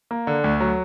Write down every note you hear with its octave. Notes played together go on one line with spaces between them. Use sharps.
A#3
D3
D2
F#3